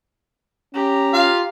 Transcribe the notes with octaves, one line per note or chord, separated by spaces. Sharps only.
C#4 G4 A#5
F4 F5